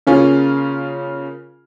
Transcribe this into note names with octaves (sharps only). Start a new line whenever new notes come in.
C#3 A#3 C#4 F4 G#4